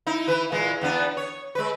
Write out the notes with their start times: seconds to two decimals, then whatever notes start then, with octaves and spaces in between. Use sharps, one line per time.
0.07 D#4 E4
0.28 E3 B4
0.52 A#2 E3 G#3
0.81 E2 B3 D4
1.17 C#5
1.55 G#3 B4